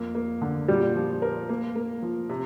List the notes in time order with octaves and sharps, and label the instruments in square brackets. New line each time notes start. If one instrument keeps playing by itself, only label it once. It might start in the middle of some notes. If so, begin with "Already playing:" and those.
Already playing: [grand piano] F2 A#3
A#3
D3
[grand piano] A#2 [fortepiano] G3
[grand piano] F3
A#4
A#3
A#3
F3
C3